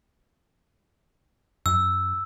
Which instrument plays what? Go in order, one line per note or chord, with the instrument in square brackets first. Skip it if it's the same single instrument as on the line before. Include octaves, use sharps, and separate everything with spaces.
[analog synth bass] F#2 [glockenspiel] E6